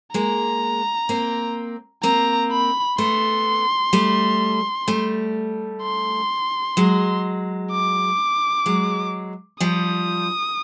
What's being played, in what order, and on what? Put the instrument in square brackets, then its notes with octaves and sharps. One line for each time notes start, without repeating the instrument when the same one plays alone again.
[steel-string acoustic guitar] G#3 A#3 [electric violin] A#5
[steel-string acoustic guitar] A#3 C4
[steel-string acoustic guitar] A#3 C4 [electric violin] A#5
[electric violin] B5
[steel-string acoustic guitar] A3 B3 [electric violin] C6
[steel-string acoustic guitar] G3 A3
G3 A3
[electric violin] C6
[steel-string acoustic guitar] F#3 G#3
[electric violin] D6
[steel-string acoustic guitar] F#3 G#3
[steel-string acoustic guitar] F3 G3 [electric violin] D#6